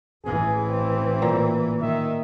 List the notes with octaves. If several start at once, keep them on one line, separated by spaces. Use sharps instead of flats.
A1 E3 G#4
C4
A#2
D#3 E5